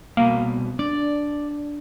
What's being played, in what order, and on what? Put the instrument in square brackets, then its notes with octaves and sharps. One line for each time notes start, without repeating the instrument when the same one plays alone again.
[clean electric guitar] C2 B2 [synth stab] A#3
[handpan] D4 [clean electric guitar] D5